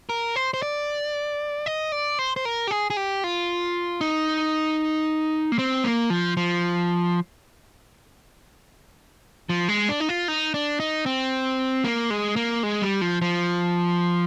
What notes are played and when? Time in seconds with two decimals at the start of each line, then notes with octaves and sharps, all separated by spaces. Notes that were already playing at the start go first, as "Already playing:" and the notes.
0.09 A#4
0.36 C5
0.54 C5
0.63 D5
1.66 D#5
1.92 D5
2.19 C5
2.36 C5
2.45 A#4
2.67 G4
2.71 G#4
2.90 G#4
2.97 G4
3.24 F4
4.01 D#4
5.52 A#3
5.59 C4
5.84 A#3
6.10 F3
6.37 F3
9.49 F3
9.69 G#3
9.89 D4
10.00 D#4
10.09 F4
10.28 D#4
10.54 D4
10.80 D#4
11.06 C4
11.85 A#3
12.10 G#3
12.36 A#3
12.63 G#3
12.82 G3
13.01 F3
13.22 F3